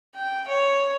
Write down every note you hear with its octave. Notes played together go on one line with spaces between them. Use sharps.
G5
C#5